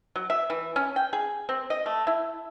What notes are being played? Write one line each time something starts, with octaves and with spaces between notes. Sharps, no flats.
F#3
E5
E3
C#4
G5
G#4
C4
D#5
A3
E4